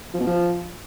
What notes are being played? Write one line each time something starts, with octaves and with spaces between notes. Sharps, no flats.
F3
B2
F3